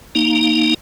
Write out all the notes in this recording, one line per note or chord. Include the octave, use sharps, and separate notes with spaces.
A#3 D#4